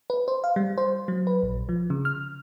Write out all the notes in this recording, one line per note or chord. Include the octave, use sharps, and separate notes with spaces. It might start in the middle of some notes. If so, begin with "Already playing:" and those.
B4
C5
F5
G3
C5
F#3
B4
A#1
F3
C#3
F6